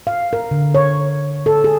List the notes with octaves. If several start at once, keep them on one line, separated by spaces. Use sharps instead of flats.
F5
A#4
D3
C#5
A4
G#4